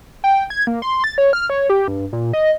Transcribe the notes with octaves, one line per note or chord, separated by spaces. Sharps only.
G5
G#6
A#3
C6
A6
C#5
F6
C#5
G4
G2
A#2
D#5